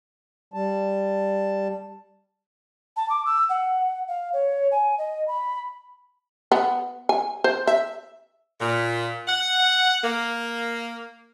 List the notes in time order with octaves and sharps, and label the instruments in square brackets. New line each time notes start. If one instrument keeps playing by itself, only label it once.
[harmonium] G3 A5
[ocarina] A5
D6
E6
F#5
F5
C#5
G#5
D#5
B5
[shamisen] B3
G#5
C5
E5
[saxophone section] A#2
F#5
A#3